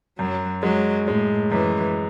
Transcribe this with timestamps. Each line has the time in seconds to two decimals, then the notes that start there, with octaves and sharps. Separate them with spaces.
0.18 F#2 F#3
0.63 F#3 G#3
1.08 A2 G#3
1.51 F#2 E3